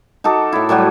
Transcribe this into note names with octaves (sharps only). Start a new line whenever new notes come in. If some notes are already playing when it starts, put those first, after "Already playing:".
D#4 F#4 A4 D6
A2 E4
A2 F#3 G3 F#4